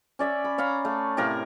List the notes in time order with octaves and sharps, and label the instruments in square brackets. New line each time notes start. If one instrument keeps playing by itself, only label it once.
[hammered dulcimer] C#4 D5 E5
B5
C#5 F5 A#5 B5
A3 F5
A2 C3 A#4 F5